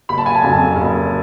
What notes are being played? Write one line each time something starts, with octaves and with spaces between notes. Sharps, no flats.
F#1 B5
A5
G#5
A5
F2 C#3 F#3
F#1